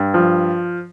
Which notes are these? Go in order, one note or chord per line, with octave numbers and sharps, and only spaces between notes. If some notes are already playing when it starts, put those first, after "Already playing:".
Already playing: G2
F3